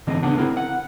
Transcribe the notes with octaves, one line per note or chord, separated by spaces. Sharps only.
G#2 D3 E3 C4 D#5
D2 C#3 B3 D4 G#4 F#5
C4 E4 A#4
F#5